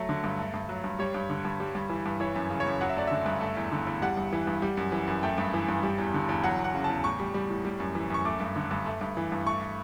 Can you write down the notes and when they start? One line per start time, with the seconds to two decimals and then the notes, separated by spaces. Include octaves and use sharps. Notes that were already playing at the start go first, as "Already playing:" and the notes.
Already playing: F#3 A3
0.09 D3
0.24 G2
0.39 A3
0.54 G2
0.69 F#3
0.84 G2
0.99 G3 C#5
1.14 G2
1.30 D3
1.45 G2
1.60 G3
1.75 G2
1.90 E3
2.06 G2
2.20 E3 C#5
2.36 F#2
2.50 C#3
2.60 C#5
2.66 F#2
2.81 F#3 F#5
2.89 E5
2.96 A3 D5
3.07 D3 E5
3.26 G2
3.41 A3
3.57 E2
3.72 D3
3.87 E2
4.02 G3 F#5
4.17 G2
4.33 E3
4.47 G2
4.62 G3
4.77 F#2
4.92 E3
5.08 F#2
5.23 A3 G5
5.38 G2
5.54 E3
5.68 G2
5.83 G3
5.98 E2
6.14 D3
6.29 E2
6.44 F#3 F#5
6.59 E2
6.64 F#5
6.74 C#3
6.84 A5
6.89 E2
7.04 A2 C#6
7.20 G3
7.34 G3
7.50 A2
7.65 G3
7.80 F#2
7.95 E3
8.10 F#2 C#6
8.25 A3 D6
8.40 G2
8.56 D3
8.71 G2
8.86 A3
9.01 G2
9.17 E3
9.32 G2
9.46 A3 C#6